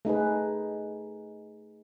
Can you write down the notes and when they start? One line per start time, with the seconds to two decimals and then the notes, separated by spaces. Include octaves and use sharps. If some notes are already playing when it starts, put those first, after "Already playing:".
0.05 A3 D#4 G#4 B4